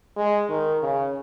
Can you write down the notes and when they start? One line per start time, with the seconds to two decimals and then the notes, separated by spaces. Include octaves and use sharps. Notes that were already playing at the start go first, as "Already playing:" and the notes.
0.17 G#3
0.50 D#3
0.83 C#3